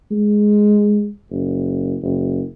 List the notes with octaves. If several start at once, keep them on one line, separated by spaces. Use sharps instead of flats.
G#3
F#1
F#1